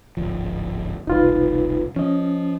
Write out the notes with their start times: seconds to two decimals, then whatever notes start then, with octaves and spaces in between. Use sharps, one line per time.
0.17 D1 G#1 F3
1.07 E1 C2 D#4 F4 B4
1.96 F3 C#4 D#5